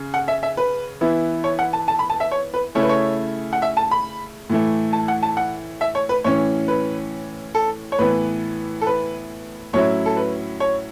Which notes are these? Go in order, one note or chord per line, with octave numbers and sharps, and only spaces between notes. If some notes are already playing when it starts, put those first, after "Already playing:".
Already playing: C#3
F#5
E5
E5
B4
E3 B3 E4
C#5
F#5
A5
A5
B5
A5
E5
C#5
B4
C#3 A3 E4 C#5
B4
C#5
F#5
E5
A5
B5
A2 E3 A3
A5
F#5
A5
F#5
E5
C#5
B4
A2 E3 C#4 C#5
B4
A4
C#5
A2 E3 B3 B4
A4
B4
A2 F#3 C#4 E4 C#5
A4
B4
C#5